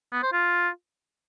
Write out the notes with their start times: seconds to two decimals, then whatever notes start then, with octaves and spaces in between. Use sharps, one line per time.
0.12 B3
0.23 C5
0.33 F4